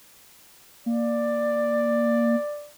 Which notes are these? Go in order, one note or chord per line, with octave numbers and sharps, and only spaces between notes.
A#3 D5